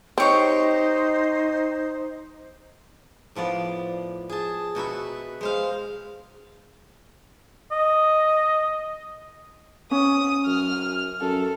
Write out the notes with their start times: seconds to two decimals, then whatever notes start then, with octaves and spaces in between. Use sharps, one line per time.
0.18 C4 D#4 G4 C5 C#5 C#6
3.35 A2 F3 B3 D5
4.29 G#4 A5
4.75 B2 F#4 B4 E5
5.41 G#3 C5 F5
7.71 D#5
9.91 C#4 D#6
10.47 F#2 F6
11.21 F#2 A4